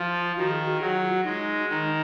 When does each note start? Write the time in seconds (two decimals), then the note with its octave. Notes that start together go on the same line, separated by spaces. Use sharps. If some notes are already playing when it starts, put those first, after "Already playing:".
Already playing: F3 F4
0.37 D#3 F#4
0.51 G#4
0.65 F#4
0.81 F#3 G#4
0.96 F4
1.10 F#4
1.25 G#3 D#4
1.69 D#3 D#4